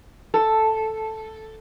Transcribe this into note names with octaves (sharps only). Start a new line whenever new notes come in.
A4